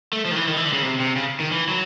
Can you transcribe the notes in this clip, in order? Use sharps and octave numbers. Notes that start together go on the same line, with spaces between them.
A3
F3
D#3
E3
D#3
E3
D3
C#3
C3
C3
C#3
D#3
E3
F#3